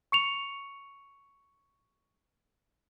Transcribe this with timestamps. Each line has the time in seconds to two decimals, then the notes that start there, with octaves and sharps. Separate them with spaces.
0.12 C#6 C#7 F7